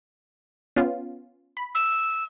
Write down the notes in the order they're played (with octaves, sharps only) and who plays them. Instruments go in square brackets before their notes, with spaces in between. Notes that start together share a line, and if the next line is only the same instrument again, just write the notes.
[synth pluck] B3 C#4 F4
B5
[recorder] E6